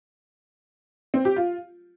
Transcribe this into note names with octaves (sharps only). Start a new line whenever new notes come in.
C4
G4
F4